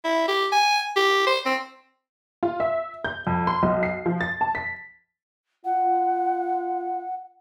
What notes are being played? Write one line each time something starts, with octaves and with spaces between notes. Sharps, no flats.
E4
G4
G#5
G4
C5
C4
F4
E5
G6
F2
C6
B1
C7
F3
A6
A5
B6
F4 F#5